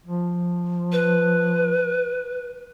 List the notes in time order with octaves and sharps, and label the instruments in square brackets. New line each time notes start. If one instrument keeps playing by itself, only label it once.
[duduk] F3
[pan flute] B4